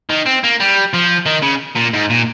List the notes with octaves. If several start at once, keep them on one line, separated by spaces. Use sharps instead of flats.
D#3
C4
A#3
G3
F3
D#3
C#3
A#2
G#2
A#2